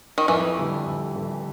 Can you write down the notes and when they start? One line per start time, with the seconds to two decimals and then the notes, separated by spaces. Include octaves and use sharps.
0.18 D#3
0.28 F2 E3
0.58 D3 G3
0.86 F2
1.15 D3 G3